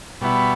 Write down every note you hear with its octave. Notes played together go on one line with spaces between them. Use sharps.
B2 G3 B3 E4